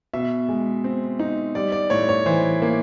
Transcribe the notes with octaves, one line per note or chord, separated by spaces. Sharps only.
B2 E5
G#3
C4
D#4
G3 D5
D5
A2 C#5
C#5
E3 C5
A#3